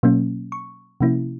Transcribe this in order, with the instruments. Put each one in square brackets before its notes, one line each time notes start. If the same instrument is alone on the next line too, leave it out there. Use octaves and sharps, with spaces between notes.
[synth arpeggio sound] B2 F#3 A#3 C#4
C#6
C3 F3 A#3 C#4 E4